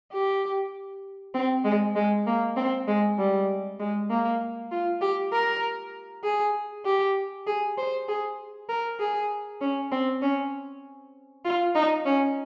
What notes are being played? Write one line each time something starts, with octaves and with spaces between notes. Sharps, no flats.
G4
C4
G#3
G#3
A#3
C4
G#3
G3
G#3
A#3
F4
G4
A#4
G#4
G4
G#4
C5
G#4
A#4
G#4
C#4
C4
C#4
F4
D#4
C#4